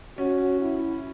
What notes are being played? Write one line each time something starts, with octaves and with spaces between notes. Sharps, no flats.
C#4 F#4
E4